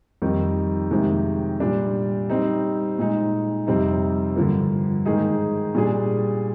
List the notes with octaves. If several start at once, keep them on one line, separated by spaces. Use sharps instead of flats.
F2 D#3 G3 A#3 D#4
F2 C3 D#3 G#3
A#2 G3 D4
G3 C4 D#4
A#2 G#3 D#4
F2 C3 G3 C4 D#4
G2 D3 F3 A#3
G#2 D#3 A#3 D#4 G#4
A#2 G3 D4 G#4